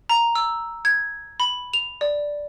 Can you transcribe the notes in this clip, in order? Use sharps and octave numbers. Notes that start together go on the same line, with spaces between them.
A#5
E6
G#6
B5
F7
D5